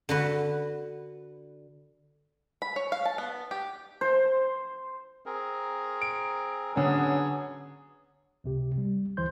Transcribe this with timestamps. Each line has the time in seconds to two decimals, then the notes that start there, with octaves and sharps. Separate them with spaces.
0.09 D3 F#4 B4
2.62 B5
2.76 C#5
2.92 F5
3.05 A5
3.18 B3
3.51 G4
4.01 C5
5.26 C4 G#4 A#4
6.02 D7
6.76 D3 F#3 B3 C#4 G#4
8.44 C#2 C3 G4
8.78 G3
9.17 D2 E3 C5 C6 G6